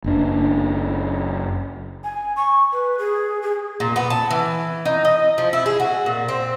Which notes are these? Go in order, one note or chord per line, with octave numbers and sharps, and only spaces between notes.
F#1 D4
G#5
C#6
B4
G#4
G#4
A#2
B3
A5
E3
D#4
D#5
F3
E4
G#4
F#4
A#2
C4